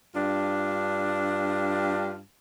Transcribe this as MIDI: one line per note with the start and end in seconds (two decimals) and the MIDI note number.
0.14 2.19 43
0.14 2.19 62
0.14 2.19 65